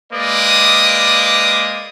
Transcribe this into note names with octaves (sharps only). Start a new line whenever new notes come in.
G#3 A#3 B4 D5 D6 D#6